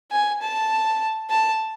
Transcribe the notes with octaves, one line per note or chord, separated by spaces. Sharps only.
G#5
A5
A5